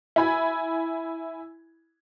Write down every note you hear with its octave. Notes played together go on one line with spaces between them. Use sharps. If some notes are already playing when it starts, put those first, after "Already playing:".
E4 G#5 B5 G#6